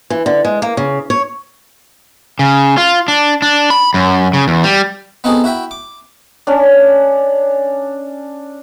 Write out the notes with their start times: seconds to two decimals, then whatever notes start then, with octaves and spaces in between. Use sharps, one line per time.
0.10 E3
0.26 D3
0.45 G#3
0.62 A#3
0.77 C#3
1.10 C#5
2.39 C#3
2.78 F4
3.08 D4
3.42 D4
3.70 B5
3.94 F#2
4.33 C#3
4.48 E2
4.64 G3
5.24 B3 C4 D#4 F#4 G#4 A4
5.44 E4 F#4 E5 G5
5.71 D6
6.47 C#4 D4